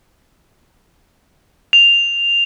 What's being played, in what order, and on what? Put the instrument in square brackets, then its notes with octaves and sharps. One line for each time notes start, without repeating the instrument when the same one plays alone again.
[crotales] F7